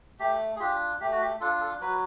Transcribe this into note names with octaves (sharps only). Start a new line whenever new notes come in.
A3 G4
G#4
D4 F4 G4
A3 G4
F#4
G4
D4 F4 A4
A4
F#3 B4